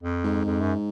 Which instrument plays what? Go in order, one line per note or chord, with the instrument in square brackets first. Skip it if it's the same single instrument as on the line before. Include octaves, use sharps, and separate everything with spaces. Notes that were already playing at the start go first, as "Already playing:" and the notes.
[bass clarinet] F2
[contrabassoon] G#2
[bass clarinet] F2
F#2